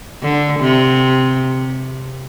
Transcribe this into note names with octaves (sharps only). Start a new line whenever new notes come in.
D3
C3